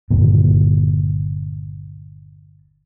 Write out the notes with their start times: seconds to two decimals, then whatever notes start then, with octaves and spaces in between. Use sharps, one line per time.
0.11 G1 D#2 A#2